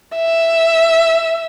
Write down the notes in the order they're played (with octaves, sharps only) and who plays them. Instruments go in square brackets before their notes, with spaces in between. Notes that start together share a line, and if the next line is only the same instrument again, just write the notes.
[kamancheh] E5